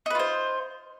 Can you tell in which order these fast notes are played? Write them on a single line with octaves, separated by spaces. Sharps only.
D#4 B4 F4 C5